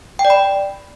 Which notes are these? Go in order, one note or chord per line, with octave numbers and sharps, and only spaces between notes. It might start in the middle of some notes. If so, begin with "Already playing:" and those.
G5
D5
B5